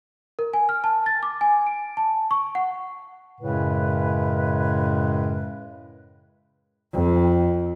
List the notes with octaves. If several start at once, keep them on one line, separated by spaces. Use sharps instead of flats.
A#4
G#5
F6
A5
A6
D6
G#5
D7
A5
C#6
F#5
F#2 A2 C#3 G#3 B4
F2